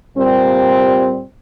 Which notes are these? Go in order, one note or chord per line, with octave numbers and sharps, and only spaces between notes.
A#2 G3 C4